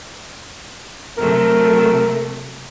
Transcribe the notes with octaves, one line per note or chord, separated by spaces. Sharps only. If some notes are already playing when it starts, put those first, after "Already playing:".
C3 F#3 A3 A#4